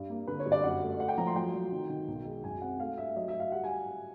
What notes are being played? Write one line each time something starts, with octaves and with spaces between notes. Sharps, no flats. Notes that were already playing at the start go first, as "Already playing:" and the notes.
Already playing: G2
A#3
D3 B4
C#5
G2
D5
F#2 F#5
A3
A3 F#5
G5
F3 A#5
C6
F#3 G5
F#3
D#3
D#3
B1
G#3
F#2 G#5
C4 F#5
A3 F5
G2 E5
F#3 D#5
E5
F#3
F5
G3 F#5
G#5